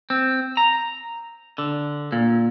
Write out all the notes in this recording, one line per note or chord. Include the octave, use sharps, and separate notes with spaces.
C4
A#5
D3
A#2